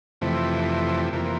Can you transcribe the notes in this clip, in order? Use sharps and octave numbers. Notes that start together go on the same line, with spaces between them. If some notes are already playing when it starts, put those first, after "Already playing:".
F2 C3 E3 A3
F2 C3 E3 A#3